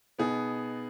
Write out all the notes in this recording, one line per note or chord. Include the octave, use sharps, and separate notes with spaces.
B2 B3 D#4 G#4